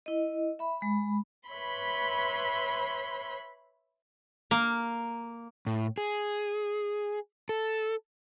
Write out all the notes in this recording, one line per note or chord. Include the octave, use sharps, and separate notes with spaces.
E4 D#5
E5 B5
G#3 B5
B4 C#5 E5 B5 C6
A#3
A2
G#4
A4